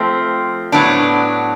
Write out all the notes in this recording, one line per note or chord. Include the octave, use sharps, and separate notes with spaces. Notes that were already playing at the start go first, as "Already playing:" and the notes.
Already playing: F3 A3 C4
A2 F#3 B3 D4